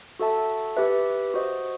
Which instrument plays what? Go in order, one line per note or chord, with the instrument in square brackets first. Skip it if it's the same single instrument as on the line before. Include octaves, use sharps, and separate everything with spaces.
[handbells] F#4 A4 E5 A5
G4 B4 E5
F#4 C5 D#5